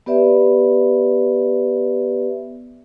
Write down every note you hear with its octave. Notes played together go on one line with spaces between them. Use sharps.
B3 G4 B4 D5 E5